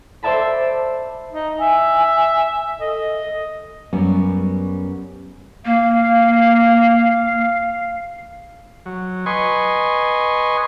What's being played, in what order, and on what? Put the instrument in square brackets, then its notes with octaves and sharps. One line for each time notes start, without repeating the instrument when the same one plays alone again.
[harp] C5 D5 E5 A5 B5
[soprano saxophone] D#4
[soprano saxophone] E5 [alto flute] G#5
[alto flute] A4 [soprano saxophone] D#5
[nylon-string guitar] F#2 G3 B3 C#4
[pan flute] A#3 [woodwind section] F5
[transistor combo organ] F#3
B4 D#5 G#5 C6 C#6